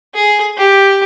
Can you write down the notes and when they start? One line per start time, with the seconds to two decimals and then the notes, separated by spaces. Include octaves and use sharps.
0.15 G#4
0.57 G4